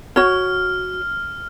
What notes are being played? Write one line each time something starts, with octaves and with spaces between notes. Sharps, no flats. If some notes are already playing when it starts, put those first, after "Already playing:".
F#4 C#5 F6